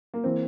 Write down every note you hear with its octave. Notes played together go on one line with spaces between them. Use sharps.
A#3
E3 A#3 C4